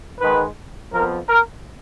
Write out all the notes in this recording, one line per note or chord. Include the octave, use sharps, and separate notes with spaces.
G#2 D#3 G#3 B4
F2 F3 B3 A#4
A#4